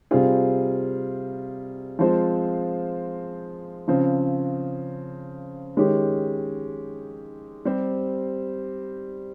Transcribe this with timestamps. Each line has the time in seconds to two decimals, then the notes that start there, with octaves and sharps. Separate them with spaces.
0.11 C3 G3 C4 F4 G#4
1.99 F3 G#3 C4 F4 C5
3.88 C#3 F3 C4
5.77 D#3 G#3 C#4 G4
7.65 G3 C4 G4 C5